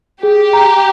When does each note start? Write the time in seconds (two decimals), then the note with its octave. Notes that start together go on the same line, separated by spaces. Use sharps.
0.23 G4 G#4
0.53 A#5